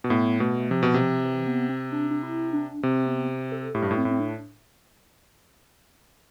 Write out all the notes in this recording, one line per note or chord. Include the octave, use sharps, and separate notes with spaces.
B2
A2 B3
B2 A3
C3 F3
B2
C3
F3
E3
B3
C4
D4
D4
E4
D4
C3 C4
B3
A4
A2 G4
G2
A2
C4
A2
C4
D4